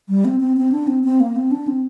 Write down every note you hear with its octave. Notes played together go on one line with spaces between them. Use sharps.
G3
C4
C4
C4
D4
C4
C4
A#3
C4
D4
C4